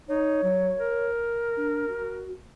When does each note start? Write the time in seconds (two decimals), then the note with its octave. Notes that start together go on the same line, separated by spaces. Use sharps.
0.08 D#4 C#5
0.43 F#3
0.78 A#4
1.57 D4
1.88 F#4